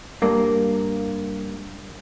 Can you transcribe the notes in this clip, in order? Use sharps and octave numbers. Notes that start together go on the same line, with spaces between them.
G2 A#3